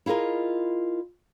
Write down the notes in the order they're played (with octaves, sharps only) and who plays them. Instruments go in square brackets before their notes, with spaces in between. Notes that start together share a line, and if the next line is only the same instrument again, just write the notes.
[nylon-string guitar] E4 F4 G#4 A#4 D#5